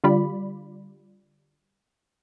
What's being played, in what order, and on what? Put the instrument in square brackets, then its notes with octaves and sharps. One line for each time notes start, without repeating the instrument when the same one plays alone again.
[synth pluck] D3 G3 F4 D5 B5